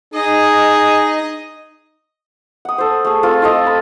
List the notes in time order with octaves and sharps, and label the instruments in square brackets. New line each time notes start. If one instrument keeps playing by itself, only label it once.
[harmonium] D#4 [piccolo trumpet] G#4 [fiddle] D#5
[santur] F#5 D#6
A4 C5
A3 G#4
C4 F4 A4
F4 G4 A4 D#5
B5